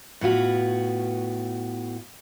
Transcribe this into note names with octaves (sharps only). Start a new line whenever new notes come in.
A2 B3 F4 F#4